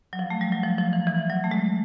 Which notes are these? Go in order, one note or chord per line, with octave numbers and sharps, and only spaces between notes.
F#3
F3
A3
G3
F#3
F3
F3
E3
E3
F#3
A3
G#3